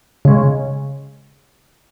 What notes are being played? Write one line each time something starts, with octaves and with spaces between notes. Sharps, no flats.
C#3 G#3